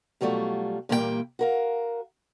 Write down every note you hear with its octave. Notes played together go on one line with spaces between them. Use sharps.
B2 F#3 G3 A3 F4
A#2 E3 G3 A#3 A#4 G5
F#4 A#4 F5